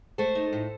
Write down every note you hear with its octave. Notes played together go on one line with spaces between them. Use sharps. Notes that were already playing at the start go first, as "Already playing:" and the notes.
A3 A4 C5
D#4
A2